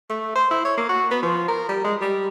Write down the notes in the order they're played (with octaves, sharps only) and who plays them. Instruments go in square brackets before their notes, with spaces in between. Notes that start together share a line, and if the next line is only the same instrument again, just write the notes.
[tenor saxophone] A3
C5
E4
C#5
A#3
F#4
B3
F3
A#4
G3
G#3
G3